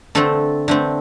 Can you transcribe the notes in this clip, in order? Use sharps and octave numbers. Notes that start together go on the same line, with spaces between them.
D3 A3 C4 A4
D3 A3 C4